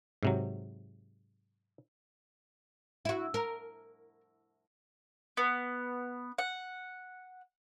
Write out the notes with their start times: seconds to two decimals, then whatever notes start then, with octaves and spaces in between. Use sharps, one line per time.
0.23 G#2 C3 F#3
3.05 E4 F#4
3.34 A#4
5.37 B3
6.38 F#5